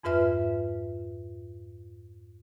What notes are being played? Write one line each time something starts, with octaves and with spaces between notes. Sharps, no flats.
F2 G#2 F4 B4 E5 F6